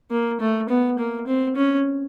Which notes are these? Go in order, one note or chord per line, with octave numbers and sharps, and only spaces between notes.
A#3
A3
B3
A#3
C4
C#4